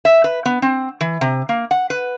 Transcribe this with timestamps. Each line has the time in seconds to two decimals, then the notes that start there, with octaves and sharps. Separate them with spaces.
0.05 E5
0.24 B4
0.46 B3
0.62 C4
1.01 E3
1.21 C3
1.49 A#3
1.71 F#5
1.90 B4